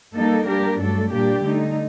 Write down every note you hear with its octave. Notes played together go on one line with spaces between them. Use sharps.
G3 A#3 D#4 A4
G3 A#3 D4 G4 A#4
G2 F#3 A3 D4 A4
A#2 G3 A#3 D4 G4
D3 A3 D#4